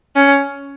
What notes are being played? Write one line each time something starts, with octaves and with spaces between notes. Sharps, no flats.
C#4